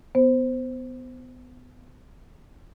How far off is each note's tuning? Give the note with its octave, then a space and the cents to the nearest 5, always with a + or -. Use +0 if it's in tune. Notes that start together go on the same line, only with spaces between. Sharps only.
B3 +20 C5 +0